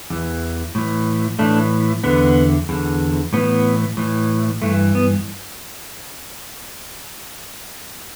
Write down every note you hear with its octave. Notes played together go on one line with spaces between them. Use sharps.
E2 E3
A2 E3
A2 E3 A3 D4
E2 D3 B3
E2 D3
A2 E3 B3
A2 E3
G2 E3 A3
B3